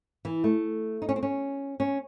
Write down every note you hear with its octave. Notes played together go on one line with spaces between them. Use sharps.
E3
A3
D#4
C#4
C4
C#4
C#4